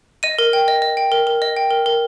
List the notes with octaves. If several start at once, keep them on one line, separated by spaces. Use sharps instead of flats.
D#5 D#7
A#4
G5
D#5
D#5
G5
A#4
A#4
D#5
G5
A#4
A#4